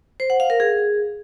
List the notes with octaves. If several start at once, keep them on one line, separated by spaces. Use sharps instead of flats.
C5
F#5
F5
A#4
G#4